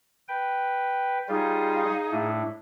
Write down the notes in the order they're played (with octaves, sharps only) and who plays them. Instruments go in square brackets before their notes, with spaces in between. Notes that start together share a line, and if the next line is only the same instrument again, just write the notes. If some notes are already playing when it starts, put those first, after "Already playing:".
[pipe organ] B4 G5
[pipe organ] G3 F4 [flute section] D#4 G#4 F5
[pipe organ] A2 A3 D4